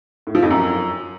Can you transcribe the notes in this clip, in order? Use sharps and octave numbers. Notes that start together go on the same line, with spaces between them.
A2
F3
F2
F#2